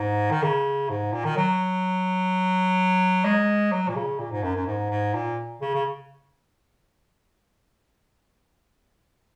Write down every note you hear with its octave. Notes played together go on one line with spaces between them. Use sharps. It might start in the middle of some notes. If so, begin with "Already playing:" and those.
Already playing: G#2
D#3
C#3
G#2
A#2
D#3
F#3
G#3
F#3
A#2
C#3
A#2
G#2
F#2
F#2
G#2
G#2
A#2
C#3
C#3